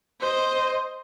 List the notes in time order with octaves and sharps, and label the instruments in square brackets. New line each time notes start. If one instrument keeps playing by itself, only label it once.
[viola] C5 D#5